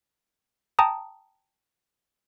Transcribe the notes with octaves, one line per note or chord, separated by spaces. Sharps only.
G5 A5 A#5 D#6